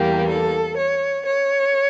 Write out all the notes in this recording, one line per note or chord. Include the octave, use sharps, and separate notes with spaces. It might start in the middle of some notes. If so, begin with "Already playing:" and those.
Already playing: E2 E3 G3 A#3 G4
A4
C#5
C#5